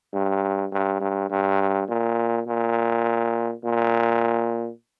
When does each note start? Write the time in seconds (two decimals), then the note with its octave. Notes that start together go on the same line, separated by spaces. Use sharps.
0.13 G2
0.71 G2
1.00 G2
1.30 G2
1.89 A#2
2.47 A#2
3.64 A#2